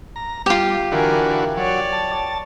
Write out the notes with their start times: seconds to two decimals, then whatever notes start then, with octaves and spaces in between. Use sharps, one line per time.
0.16 A#5
0.46 G3 F4 G4
0.92 D3 E3 F#4 A#4 G#5
1.57 F#3 C#5 D5
1.93 A5